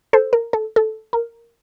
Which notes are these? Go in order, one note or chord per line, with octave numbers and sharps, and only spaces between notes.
A4 C5
A#4
A4
A4
A#4